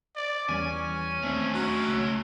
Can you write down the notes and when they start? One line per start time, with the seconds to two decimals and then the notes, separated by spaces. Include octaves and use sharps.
0.16 D5
0.49 E2 G3 B3 C#4 G#5
1.23 D#2 A3 C4 D4 G#4
1.54 F#3
1.88 C#2